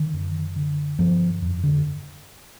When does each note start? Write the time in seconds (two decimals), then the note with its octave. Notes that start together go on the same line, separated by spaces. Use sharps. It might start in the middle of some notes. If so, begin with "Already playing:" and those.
Already playing: D3 D#3
0.13 F#2
0.56 D3
0.99 G2 F3
1.42 F2
1.64 D3